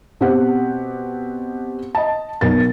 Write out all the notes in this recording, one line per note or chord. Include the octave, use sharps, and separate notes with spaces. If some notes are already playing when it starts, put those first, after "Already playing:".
B2 C4 G4 F#5
D#5 A5
B1 B2 A#4 A6